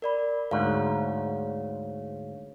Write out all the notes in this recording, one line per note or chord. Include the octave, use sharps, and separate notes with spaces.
A#4 D5 B5
D2 G#2 C#5 F5